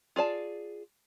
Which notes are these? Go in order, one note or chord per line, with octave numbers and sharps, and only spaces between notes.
F4 G#4 D5 A5